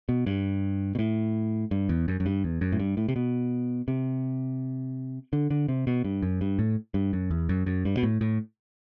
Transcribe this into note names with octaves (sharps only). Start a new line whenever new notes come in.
B2
G2
B2
A2
G2
E2
F#2
F#2
G2
E2
F#2
A2
G2
A2
C3
B2
C3
D3
D3
C3
B2
G2
F#2
G2
A2
G2
F#2
E2
F#2
F#2
G2
B2
A2
A2